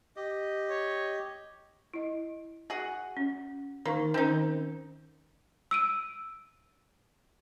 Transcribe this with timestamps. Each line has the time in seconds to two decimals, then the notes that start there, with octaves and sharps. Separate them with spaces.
0.16 G4 D#5
0.70 C#5
1.94 E4 D#5
2.70 F#4 G#4 F#5
3.17 C#4
3.85 D#3 A#3 D#4 C#6
4.14 D#3 C4 C#4 D#4 A#4
5.71 E6 D7 D#7